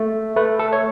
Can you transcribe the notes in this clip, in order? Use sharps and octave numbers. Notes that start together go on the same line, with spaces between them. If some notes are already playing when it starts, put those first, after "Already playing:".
Already playing: A3
A3 B4
A4
C#5